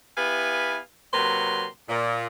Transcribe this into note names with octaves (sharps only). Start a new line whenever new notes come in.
B3 E4 G4 B4 F5 G#5
C3 F#3 A#3 B4 A#5 C6
A#2